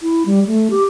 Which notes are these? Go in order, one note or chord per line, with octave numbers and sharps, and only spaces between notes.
E4
G3
A3
G4